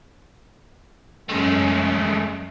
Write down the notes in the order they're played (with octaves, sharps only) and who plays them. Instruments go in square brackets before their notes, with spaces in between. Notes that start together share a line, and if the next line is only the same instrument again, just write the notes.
[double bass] F#2 C#4 [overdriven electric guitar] G#3 A3